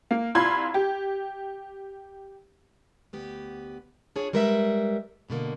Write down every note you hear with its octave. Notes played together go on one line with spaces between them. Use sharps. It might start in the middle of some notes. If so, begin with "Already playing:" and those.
A#3
C2 F4 B5 C6 G#6
G4
D2 B3 G4
D4 F4 G#4 C#5
G3 G#3 A#4 B4 D#5 E5
G2 B2 D3 A#3